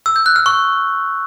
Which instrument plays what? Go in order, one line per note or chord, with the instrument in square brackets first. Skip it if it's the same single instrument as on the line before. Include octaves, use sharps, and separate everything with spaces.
[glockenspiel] E6
G6
F#6
F6
C#6